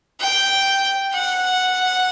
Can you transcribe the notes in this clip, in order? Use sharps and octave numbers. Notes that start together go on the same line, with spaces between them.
G5
F#5